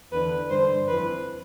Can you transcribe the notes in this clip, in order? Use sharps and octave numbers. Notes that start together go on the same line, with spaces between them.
E2 D3 B4
G2 D3 C5
F2 E3 B4